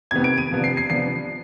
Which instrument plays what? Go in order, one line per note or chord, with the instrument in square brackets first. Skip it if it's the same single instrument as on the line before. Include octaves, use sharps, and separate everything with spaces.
[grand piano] F2 C3 D#3 B3 G#6
D7
D#7
C3 F3 B3 D4
C7
C7
C3 F3 B3 D4 C7